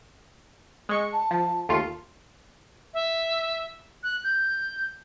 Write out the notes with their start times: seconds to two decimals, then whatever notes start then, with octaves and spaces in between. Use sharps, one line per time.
0.89 G#3 C#6 C#7
1.13 A5
1.31 F3
1.69 D#2 A3 F4
2.94 E5
4.03 F#6
4.24 G6